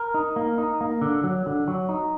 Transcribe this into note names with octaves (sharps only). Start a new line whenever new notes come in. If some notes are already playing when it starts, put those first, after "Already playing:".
Already playing: A#4
D#4
A#3
D#4
A#3
D3
F#3
D3
F#3
D#4